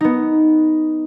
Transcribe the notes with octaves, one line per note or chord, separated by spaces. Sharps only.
B3 D#4